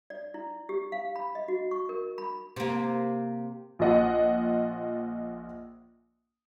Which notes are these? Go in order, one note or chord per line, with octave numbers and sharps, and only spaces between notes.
D5
E4
G4
F5
B5
D#5
F#4
C#6
A#4
B5
C3 A#3
A#1 F4 D#5 F#5